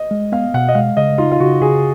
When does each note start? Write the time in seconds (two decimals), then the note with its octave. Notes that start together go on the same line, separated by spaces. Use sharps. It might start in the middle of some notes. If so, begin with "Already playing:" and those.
Already playing: D#5
0.11 G#3
0.32 B3 F5
0.54 B2 F#5
0.68 D#5
0.75 G#3 F5
0.97 C#3 D#5
1.18 D#4 F4
1.32 F4
1.40 C#3 F#4
1.61 C#3 G#4